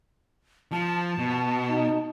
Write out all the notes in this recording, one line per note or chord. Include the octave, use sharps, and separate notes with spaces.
F3 A5
B2
D#4